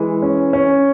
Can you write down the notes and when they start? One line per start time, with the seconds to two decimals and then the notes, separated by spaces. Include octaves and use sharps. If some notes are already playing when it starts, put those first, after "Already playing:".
Already playing: E3 G#3
0.22 C#4
0.53 C#4